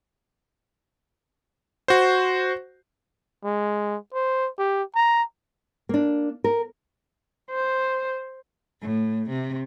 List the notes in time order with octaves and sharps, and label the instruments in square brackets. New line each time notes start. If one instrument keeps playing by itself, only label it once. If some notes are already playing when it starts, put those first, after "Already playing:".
[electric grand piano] F#4 C5
[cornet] G#3
C5
G4
A#5
[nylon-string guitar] A#3 D4
A#4
[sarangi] C5
[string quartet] A2
C3